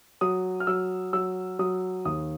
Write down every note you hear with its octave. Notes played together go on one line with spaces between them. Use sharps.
F#3 D#6
F6
F#3 E6
F#3 E6
F#3 D#6
D#2 D#6